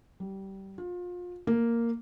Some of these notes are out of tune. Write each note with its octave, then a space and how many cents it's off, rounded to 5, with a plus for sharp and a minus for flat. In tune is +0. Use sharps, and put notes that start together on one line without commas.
G3 -20
F4 +30
A#3 -5